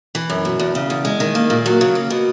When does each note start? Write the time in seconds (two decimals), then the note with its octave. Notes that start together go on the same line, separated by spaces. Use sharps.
0.15 E3
0.30 F#2
0.45 B2
0.59 E2
0.75 C#3
0.90 E2
1.05 G#3
1.20 D#3
1.35 A#3
1.50 A#2
1.66 F#3
1.81 C#3
1.95 A#3
2.10 B2